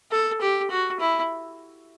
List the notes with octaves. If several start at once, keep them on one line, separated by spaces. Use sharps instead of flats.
A4
G4
F#4
E4